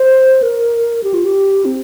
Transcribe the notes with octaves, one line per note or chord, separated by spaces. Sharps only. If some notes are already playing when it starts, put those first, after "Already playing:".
Already playing: C5
A#4
G4
F4
G4
C4